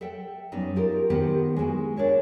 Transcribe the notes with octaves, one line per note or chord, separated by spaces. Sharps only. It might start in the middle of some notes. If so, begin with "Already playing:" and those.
A4 E5 F#5 G5
F#2 G3 B3 D#4 E5
D#4 F4 G4 A4 A#4
D#3 B3 G4 B4 C5 F#5
G#3 B3 E4 F#4
D4 A#4 C#5 E5